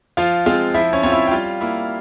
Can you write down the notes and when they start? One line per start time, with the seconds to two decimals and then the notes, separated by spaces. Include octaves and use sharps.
0.17 F3 F4 F5
0.46 G#3 C4 F4 F5
0.74 F3 E4 E5
0.93 C#4 C#5
1.03 C4 F4 C#5
1.12 E4 E5
1.27 G5
1.31 G3 F4 F5
1.61 A#3 E4